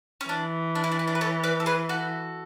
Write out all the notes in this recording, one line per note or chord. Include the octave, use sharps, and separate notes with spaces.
C#4
E3 D4
D4
E4
D4
E4
D4
B4
A4 C#5
B4 D5
A4
G#4 B4
F#4 A4